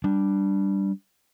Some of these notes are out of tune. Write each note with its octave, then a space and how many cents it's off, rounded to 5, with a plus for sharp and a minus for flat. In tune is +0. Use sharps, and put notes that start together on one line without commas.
G3 -5 D4 +0